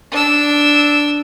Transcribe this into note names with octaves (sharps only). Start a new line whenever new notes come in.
D4 E6